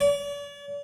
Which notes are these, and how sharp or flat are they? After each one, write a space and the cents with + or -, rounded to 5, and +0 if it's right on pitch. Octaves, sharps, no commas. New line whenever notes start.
D5 -45